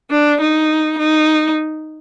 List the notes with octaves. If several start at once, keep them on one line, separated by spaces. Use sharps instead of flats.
D4
D#4
D#4